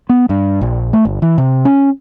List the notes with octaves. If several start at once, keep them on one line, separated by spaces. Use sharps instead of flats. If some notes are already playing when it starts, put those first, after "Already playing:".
B3
G2
A#1
A3
G1
E3
C3
C#4